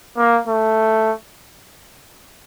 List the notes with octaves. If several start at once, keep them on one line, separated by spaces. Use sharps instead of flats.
A#3
A3